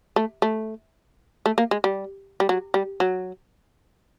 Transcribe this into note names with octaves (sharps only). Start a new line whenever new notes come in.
A3
A3
A3
A#3
G#3
G3
G3
F#3
G3
F#3